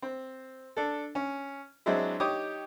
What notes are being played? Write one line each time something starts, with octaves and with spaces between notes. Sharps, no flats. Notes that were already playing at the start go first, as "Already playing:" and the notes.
C4
D4 A4
C#4
F#3 G#3 C4 D4 E4
D#4 G4 C#5 D6 D#6